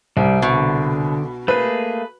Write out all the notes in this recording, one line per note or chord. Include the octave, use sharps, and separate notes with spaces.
C2 G3
B2 D3
A3 A#3 G#4 B4